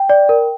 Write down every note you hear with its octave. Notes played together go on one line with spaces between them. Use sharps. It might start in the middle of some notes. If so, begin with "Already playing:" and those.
Already playing: G5
D5
A#4